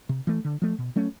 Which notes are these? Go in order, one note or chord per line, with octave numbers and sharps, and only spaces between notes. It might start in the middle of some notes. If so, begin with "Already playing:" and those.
C3
E3 A3
D3
F3 A3
B2
F#3 A3 C#4